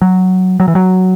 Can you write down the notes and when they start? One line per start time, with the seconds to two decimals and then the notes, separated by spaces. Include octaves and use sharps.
0.02 F#3
0.60 F#3
0.68 E3
0.75 F#3